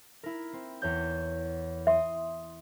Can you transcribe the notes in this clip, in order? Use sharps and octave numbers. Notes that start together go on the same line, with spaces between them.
E4 A#4
C4
E2 C#5 G6
E5 C6 D#6